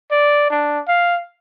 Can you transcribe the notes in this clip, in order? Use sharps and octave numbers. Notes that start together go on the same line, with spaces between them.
D5
D4
F5